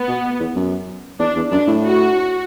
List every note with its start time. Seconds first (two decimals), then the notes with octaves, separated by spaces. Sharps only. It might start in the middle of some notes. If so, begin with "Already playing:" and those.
Already playing: B3
0.08 B2
0.40 E2
0.56 F#2
1.19 E2 D4
1.36 E2
1.51 F#2 D4
1.67 A2
1.83 F#4